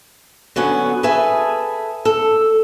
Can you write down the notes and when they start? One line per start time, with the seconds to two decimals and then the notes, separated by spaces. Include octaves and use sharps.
0.56 D3 F#3 B3 C#4
1.03 G#4 A4 B4 E5 G#5 A5
2.05 A4